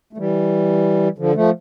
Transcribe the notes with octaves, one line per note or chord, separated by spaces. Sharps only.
A3
E3 G3
D3 F3
F3 A3